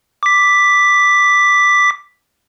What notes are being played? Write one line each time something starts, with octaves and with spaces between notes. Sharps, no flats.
D6 B6